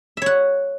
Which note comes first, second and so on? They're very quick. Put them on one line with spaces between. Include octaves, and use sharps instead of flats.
E5 C#5 F#5